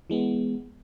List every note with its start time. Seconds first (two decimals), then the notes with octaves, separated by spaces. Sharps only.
0.10 E3 G#3 B3